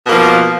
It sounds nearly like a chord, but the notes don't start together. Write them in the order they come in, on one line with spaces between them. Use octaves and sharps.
B2 A#3 F3